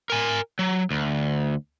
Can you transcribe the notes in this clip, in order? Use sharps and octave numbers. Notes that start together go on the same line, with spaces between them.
A#4 G#5
F#3
D2